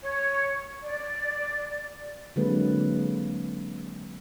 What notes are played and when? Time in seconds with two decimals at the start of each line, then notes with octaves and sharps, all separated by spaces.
0.02 C#5
0.82 D5
2.36 D3 F#3 G#3 A#3 C4 B4